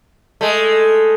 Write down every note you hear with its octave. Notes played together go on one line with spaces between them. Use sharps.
G#3 A3